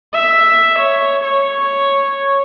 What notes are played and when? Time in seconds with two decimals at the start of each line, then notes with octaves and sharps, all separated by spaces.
0.14 E5
0.79 C#5
1.24 C#5